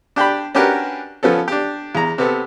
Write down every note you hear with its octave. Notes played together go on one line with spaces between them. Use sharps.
D4 G4 G5 B5
C#4 D4 F#4 G4 A#4 B4
F3 B3 C#4 A4
D4 G4
E2 A#5
C3 B3 A4